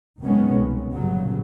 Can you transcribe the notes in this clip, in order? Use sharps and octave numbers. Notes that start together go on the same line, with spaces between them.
F#1 B2 D#3 G#3 B3 C#4
C2
G1 G2 A#2 C#3 F#3